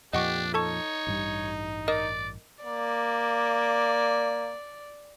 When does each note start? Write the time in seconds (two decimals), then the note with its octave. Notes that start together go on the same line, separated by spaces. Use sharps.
0.13 F2 A#2 F3 D4 G4 D#5 F#5 C#6
0.54 D#4 A4 C#5 A5 C#6
1.07 A1 G2 G3
1.88 A#4 D5 D#5 D#6
2.64 A#3 D5